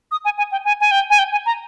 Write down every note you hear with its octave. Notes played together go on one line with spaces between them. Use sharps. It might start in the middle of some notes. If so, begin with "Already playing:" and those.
D#6
G#5
G#5
G5
G#5
G#5
G5
G#5
G5
G#5
A#5